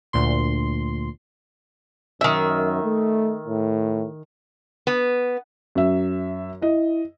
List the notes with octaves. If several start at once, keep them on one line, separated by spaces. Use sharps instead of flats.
D2 A#2 C6
F#2 D#3 E5
A3
A2
B3
F#2 E5
E4 D#5